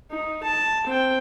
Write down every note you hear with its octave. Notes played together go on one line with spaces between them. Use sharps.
D#4
A5
C4 G5